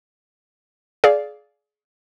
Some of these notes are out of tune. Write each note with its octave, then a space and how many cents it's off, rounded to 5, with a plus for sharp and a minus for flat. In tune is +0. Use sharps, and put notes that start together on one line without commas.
G#4 +25 D5 -10 F5 +0